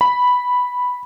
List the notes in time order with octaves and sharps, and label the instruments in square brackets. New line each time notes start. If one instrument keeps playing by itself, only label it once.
[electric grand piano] B5